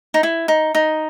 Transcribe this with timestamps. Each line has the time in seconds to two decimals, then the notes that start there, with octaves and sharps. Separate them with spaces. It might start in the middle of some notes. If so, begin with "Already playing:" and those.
0.14 D#4
0.23 E4
0.48 D#4
0.75 D#4